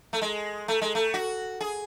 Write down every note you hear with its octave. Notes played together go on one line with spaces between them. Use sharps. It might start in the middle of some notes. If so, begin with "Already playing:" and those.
A3
G#3
A3
G#3
A3
F#4
G#4